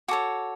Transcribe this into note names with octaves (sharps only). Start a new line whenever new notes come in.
F#4 A4 C#5 D6